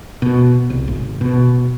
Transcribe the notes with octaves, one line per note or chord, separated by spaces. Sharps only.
B2
C2
G#1
B2